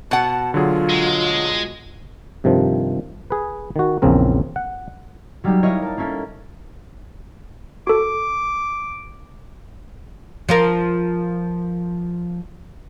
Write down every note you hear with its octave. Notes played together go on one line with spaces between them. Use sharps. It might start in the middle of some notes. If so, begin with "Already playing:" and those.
B2 F#5 A5
D3 F#3 F4 G#4
G#3
G2 C3 D#3 F3
G#4 B4
D#3 F#4
A#1 E2 C#3 C4 A#4
F#5
F#3 G3 A#3 D#4 G4
E4 A#4 C#5 D#5 F5
A#4 A5
A#3 C#4 E4 A4
F#4 A4 D6
F3 F4 A#4